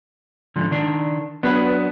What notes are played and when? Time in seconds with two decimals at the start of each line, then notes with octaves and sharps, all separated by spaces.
0.56 G#2 D3 F3
0.71 D#3 D4
1.43 F#3 B3 D4 B4